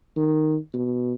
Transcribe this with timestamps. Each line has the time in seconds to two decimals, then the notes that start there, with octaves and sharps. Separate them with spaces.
0.17 D#3
0.74 B2